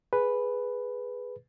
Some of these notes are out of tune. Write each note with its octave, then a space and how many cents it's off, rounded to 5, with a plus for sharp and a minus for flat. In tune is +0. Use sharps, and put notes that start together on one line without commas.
G#4 +0 B4 +0